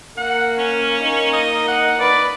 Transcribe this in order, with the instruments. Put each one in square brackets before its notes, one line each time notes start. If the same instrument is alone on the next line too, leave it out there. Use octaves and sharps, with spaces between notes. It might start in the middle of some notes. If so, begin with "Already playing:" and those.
[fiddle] A#3 [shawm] F#5
[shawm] C#4
[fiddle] A#3 D#4
[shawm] D#5
F#5
[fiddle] B4 [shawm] D5